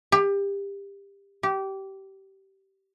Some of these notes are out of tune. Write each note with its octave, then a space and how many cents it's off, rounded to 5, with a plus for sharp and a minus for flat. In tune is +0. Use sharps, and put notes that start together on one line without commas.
G4 +25
G4 -20